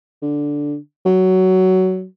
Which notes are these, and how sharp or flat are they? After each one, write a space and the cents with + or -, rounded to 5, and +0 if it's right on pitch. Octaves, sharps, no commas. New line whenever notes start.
D3 -5
F#3 +15